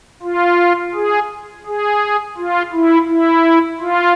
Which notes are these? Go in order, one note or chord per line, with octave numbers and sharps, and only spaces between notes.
F4
G#4
G#4
F4
E4
E4
F4